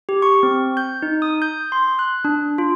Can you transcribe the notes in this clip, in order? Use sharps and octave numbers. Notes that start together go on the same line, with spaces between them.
G4
C#6
C4
G6
D#4
D#6
G6
C6
F#6
D4
F4